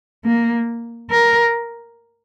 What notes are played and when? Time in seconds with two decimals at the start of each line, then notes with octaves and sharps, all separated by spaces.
0.25 A#3
1.11 A#4